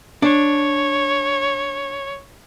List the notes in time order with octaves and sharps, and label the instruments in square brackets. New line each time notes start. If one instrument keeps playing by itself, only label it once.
[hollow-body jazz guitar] D4 [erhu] C#5